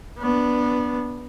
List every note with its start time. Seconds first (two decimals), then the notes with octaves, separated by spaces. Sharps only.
0.19 B3 D4